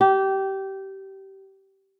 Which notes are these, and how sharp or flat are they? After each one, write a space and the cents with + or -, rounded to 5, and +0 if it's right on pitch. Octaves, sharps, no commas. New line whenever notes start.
G4 -20